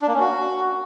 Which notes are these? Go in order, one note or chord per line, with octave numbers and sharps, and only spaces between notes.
D4
A#3
C#4
F#4